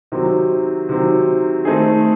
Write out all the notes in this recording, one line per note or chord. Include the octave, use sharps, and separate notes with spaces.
C3 D#3 F#3 C4
C3 D#3 F#3 C4
D#3 A3 C4 D#4 G#4